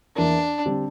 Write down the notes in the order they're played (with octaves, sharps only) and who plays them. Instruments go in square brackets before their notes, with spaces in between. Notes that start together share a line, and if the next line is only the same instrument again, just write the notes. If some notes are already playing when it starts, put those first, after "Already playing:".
[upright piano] E2 E3 A#3 E4 A#4 [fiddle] D4
[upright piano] D3 G3 C4